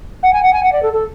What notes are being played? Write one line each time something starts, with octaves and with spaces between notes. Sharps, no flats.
F#5
G#5
F#5
G#5
F#5
D5
A4
A4